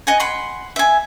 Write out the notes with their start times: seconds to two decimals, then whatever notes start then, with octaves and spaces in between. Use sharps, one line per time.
0.07 D#5 F#5 G#5
0.20 F#5 B5 C6
0.76 E5 G#5